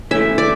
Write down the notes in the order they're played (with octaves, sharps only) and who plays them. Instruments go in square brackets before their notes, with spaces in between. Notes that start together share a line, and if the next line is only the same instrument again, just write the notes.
[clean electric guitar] E3 A3 C#4 [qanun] E5
[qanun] D5